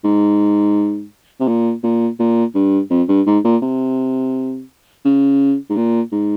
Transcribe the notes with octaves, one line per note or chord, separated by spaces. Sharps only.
G#2
C3
A#2
A#2
A#2
G2
F2
G2
G#2
A#2
C3
C#3
G#2
A#2
G#2